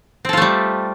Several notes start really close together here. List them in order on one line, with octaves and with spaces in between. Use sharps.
C4 A4 F4 A3 G3